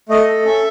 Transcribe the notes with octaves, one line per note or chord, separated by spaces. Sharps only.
A3 D#5
A4
C#4 E5